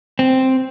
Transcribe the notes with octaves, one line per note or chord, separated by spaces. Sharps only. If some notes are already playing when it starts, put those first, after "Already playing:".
C4